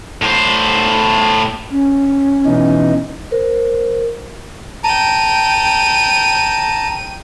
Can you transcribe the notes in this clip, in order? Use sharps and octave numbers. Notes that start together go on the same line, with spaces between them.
A2 C5
C#4
B2 E3 D#4
A#4 C5
G5 A5 A#5 D#7